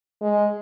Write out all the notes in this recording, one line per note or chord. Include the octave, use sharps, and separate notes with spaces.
G#3